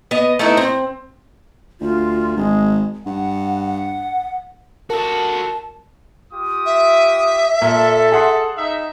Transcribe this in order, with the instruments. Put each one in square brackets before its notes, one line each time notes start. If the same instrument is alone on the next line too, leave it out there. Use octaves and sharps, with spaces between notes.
[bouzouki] B3 D#5
A3 B3 D#4 E4
C4
[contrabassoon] D2 [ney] F4
[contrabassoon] G#1 [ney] G#3
[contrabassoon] G2 [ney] F#5
[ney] F#5
[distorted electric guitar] F#4 A4 [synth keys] A#4 [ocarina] A5
[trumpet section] F4 G4 D#6
[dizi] E5
[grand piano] A#2 [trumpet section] A4
[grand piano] G#4 F#5 C6
[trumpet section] D#4 E5